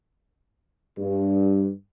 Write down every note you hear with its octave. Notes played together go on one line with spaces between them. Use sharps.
G2